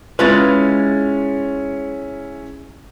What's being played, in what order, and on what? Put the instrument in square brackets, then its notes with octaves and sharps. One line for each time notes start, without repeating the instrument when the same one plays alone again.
[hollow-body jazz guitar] G#3 F4 B4 [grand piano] C#4 E4 A6